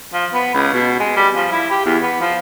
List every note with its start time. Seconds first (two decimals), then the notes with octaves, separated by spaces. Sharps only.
0.13 F3
0.33 B3
0.54 C#2
0.73 B2
1.00 G#3
1.16 G3
1.35 F3
1.51 E4
1.70 G4
1.86 E2
2.02 B3
2.20 F3